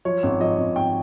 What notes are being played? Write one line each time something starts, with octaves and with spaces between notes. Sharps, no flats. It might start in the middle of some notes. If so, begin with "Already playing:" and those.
F3 C#5
G#1
F3 D#5
G#1
G#1 G5